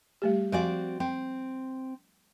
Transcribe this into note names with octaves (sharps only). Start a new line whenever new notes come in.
G3 A3 G4
F3 C4 F#4 D5 F5 G#5
C4 G5